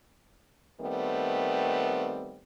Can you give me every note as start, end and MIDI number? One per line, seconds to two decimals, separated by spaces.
0.81 2.40 51
0.81 2.40 55
0.81 2.40 57
0.81 2.40 59
0.81 2.40 60